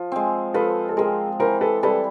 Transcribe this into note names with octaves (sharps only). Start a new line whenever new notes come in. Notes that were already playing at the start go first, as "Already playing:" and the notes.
Already playing: F3
G#3 C4
F3 A4 B4
A4
G#3 C4 G#4 A#4
E3 A#4 C5
A4 B4
G3 C4 E4 A4 B4